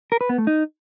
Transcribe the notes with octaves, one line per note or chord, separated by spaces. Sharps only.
A#4
B4
B3
A3
D#4